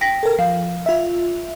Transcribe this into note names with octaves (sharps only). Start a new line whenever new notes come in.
G5 A#6 B6
A4 A#4
F3 F5
F4 E5